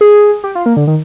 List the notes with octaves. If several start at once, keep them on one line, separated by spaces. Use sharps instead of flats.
G#4
G4
F4
A#3
D3
D#3